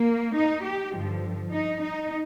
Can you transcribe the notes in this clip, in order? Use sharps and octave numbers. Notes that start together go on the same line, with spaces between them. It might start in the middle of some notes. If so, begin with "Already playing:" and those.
Already playing: A#3
D#4
G4
G2 D3 F3
D#4
D#4